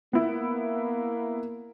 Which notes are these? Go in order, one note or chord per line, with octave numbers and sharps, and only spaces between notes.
A#3 B3 E4